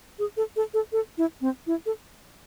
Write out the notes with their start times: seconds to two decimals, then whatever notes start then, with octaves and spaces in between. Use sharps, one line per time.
0.19 G#4
0.37 A4
0.56 A4
0.74 A4
0.92 A4
1.18 E4
1.41 C4
1.67 E4
1.86 A4